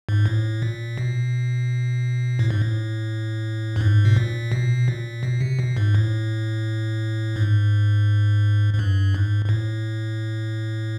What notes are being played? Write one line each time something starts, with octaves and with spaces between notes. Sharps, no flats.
G#2
A2
A#2
B2
A2
G#2
A2
G2
G#2
B2
A#2
B2
A#2
B2
C3
B2
G#2
A2
G#2
G#2
G2
G#2
G#2
A2